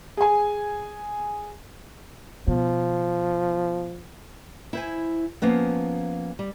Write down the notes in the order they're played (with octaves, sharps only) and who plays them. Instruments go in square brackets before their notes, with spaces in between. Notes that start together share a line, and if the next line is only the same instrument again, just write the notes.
[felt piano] G#4 G#5
[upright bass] B2 [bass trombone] F3
[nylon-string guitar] E4 C5 G#5
F3 A#3 B3 C#4
G3